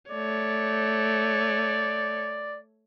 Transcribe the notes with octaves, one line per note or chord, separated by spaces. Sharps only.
A3 C#5 D5